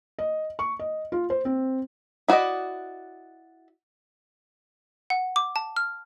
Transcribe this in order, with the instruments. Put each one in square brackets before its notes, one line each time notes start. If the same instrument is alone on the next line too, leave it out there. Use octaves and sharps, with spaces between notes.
[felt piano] D#5
C#6
D#5
F4
C5
C4
[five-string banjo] E4 F#4 B4 D5 D#5
[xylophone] F#5
D6
A5
F6